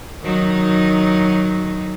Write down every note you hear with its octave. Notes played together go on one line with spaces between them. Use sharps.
D#3 F#3 D#4